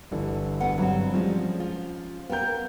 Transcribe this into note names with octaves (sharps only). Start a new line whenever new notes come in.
G1 D3 E3
D2 B3 F#5
G2 F#3 C4
F3 G3 G#3 C#4 C5
F4
B3 A#4 F5 G5 G6